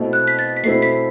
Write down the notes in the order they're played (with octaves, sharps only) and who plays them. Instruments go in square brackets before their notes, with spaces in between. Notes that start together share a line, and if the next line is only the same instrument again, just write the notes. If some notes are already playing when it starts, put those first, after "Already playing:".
Already playing: [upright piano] B2 A3 C4 E4
[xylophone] F#6
B6
A6
B6
[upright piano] B2 A3 C4 E4 [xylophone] C7
[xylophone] B6